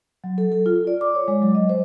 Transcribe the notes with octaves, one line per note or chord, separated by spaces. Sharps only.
F#3
A4
A4
F4
D5
D6
C#5
G#3
F#3
D#5
C5